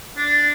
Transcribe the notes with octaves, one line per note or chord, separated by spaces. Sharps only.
D4